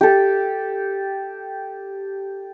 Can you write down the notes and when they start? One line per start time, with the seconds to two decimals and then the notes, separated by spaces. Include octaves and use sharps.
0.01 G4 A4